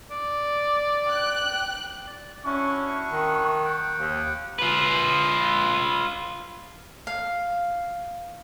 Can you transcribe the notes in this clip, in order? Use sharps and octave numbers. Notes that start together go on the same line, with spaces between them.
D5
G5 F#6
D5
C#4 D4 E4 F#4 C#6
D#3
F#5 G5 D6
D#2
F4 B4
F5